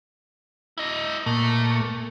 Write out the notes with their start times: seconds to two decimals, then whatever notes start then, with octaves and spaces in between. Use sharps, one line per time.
0.78 E4 D#5
1.26 A#2 A3